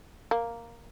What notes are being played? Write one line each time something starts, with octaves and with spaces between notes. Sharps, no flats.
A#3